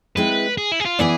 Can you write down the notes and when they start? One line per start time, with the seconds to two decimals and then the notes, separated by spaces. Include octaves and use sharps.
0.16 G#3 C4 E4 B4
0.58 G#4
0.72 E4
0.80 G#4
0.85 F4
0.99 E3 B3 E4 G#4 B4 D5